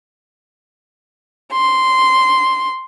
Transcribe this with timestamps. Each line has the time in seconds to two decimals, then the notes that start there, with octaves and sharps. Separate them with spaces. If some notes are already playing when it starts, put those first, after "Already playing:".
1.53 C6